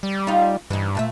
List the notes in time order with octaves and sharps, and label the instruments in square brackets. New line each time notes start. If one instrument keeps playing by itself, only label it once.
[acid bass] G3
[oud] D#4 F4
[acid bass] G2 [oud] E3 D#4
[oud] A#2 A3 E5